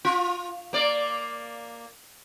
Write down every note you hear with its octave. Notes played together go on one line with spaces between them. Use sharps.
F4
A#3 D5